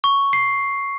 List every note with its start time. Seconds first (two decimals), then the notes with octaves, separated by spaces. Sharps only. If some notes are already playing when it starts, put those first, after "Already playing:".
0.04 C#6
0.33 C7